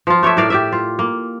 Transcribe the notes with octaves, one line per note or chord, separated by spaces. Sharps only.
F3 F4
A3 C#5 D5 E5
A2 A#4 D5 F5
G4 D5 E5
F4
A#3